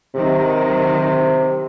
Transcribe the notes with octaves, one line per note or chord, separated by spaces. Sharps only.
C3 D#3 F#3